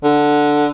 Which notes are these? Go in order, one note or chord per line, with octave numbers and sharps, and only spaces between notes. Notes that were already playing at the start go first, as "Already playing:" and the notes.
D3